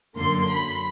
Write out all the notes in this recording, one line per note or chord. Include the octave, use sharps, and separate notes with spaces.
F#2 D3 F#3 A#3 C6
B5